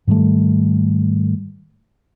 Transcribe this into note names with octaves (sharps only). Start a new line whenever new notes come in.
G#2 D#3 G3 A3